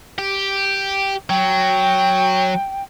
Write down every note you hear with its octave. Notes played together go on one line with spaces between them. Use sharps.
G4
F#3 G5